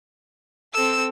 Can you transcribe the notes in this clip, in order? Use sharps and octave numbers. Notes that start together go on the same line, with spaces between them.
C4 A4 E6